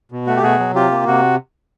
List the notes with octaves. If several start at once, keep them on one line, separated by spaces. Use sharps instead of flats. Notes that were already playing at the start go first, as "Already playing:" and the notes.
B2
A3 F#4
G4
B2 F#4 G#4
F#3
C3 F4 G4
A#3
C3 F#4